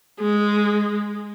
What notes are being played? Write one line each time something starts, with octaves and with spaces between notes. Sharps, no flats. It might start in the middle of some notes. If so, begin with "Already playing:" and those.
G#3